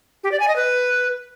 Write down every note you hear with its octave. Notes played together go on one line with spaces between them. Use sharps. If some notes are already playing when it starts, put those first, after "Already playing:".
G4
D5
G#5
D#5
B4